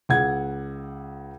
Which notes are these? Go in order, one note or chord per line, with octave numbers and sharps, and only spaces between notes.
C#2 F#5 G#6